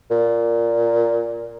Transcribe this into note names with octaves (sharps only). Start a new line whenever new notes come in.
A#2